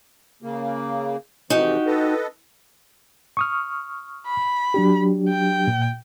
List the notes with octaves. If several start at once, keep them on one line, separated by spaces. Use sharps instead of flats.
C#3 A#3
F2 C3 E3 D#4 F#4 G4
A4 B4 D#5
C#6 D#6 F6
B5
F#3 D4 G4
G5
A#2